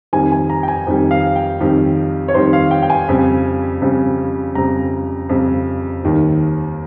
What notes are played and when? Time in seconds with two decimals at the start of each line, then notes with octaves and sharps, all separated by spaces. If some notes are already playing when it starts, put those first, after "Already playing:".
0.13 F2 D#3 G3 G#5
0.32 G#5
0.50 A#5
0.63 G5
0.68 G#5
0.87 F2 D#3 G3
1.11 F5
1.36 G5
1.60 F2 D#3 G3
2.28 C#5
2.34 F2 D#3 G3 C5
2.53 F5
2.71 G5
2.82 G5
2.90 G#5
3.09 F2 C#3 G3
3.82 F2 C#3 G3
4.55 F2 C#3 G3 A#5
5.29 F2 C#3 G3
6.03 D#2 D#3 G3